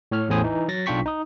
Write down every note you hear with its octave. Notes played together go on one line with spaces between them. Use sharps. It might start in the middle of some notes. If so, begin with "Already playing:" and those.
A2 C#5 F6
A1 E2 A2 C5 G#5 D#6
E3 D#4
F#3 A6 A#6
B1 D4 F4 G5 C#6 B6
D#4 D#6